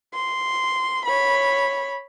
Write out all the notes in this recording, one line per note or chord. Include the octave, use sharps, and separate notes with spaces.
C6
C#5 B5